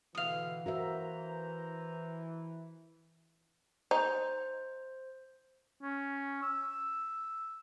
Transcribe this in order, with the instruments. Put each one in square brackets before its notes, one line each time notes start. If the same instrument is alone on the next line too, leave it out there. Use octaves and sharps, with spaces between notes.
[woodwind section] B2 D3 [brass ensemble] E3 [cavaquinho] F5 D#6
[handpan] F#4 A#4 E5 [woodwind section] C5 A#5
[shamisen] D#4 [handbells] C5
[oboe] C#4
E6